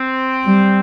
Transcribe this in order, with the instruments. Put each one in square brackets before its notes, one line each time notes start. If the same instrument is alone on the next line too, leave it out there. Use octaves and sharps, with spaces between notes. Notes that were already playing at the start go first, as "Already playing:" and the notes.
Already playing: [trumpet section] C4
[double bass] G3